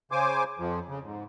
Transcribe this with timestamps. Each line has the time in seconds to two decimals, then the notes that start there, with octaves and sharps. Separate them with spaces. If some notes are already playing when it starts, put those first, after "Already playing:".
0.12 C#3 C5 G#5 D6
0.59 F2 F3
0.89 C#3
1.03 G#2